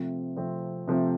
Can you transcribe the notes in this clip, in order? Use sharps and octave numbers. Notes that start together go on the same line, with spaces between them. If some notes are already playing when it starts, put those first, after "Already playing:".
Already playing: C3 F3 A3 C4
C3 F3 A3 C4
C3 F3 A3 C4